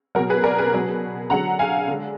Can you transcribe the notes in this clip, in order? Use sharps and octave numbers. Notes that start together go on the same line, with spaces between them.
B2 F#3 F#4 A#4
G#4 B4
A#4 D5
G#4 B4
B2 F#3
D3 F#3 F#5 A#5
F5 G#5
D3 G#3